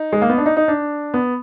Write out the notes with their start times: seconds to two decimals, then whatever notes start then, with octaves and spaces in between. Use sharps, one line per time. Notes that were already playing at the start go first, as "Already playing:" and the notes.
Already playing: D#4
0.12 G#3
0.22 A#3
0.29 B3
0.38 D4
0.46 D#4
0.57 D#4
0.68 D4
1.14 B3